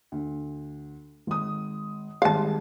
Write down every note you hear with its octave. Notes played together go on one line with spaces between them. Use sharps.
D2
G#1 D#6
G#1 G3 G#4 F5 A5